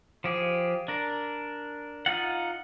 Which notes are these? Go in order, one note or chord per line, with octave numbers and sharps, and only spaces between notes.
F3 G4 G#4
D4 A#4
D#4 F4 F#5